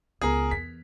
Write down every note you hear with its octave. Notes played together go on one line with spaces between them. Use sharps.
C#2 B3 G#4 A#4
E2 B6